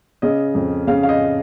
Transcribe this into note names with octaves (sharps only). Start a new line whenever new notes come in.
C#3 D#5
F2
C#3 F5
F5
D#5